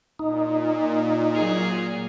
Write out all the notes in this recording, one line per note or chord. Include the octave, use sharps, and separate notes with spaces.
A#2 D#4
F#3 G#4